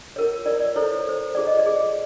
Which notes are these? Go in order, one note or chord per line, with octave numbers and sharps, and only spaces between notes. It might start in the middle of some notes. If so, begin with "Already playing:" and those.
F4 A#4 C#5
F4 A#4 C#5 D5
D5
E4 A4 C5 C#5
C#5
E4 A4 C5
F4 G#4 C#5 D5
D#5
D5
F4 G#4 C#5